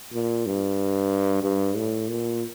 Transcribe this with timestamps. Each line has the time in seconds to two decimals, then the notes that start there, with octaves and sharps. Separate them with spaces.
0.13 A#2
0.46 G2
1.43 G2
1.77 A2
2.09 A#2